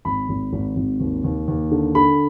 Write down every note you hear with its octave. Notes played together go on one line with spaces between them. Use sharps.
G#1 B5
G#1
G#1
G#1
D#2
D#2
D#2
D3
D3 B5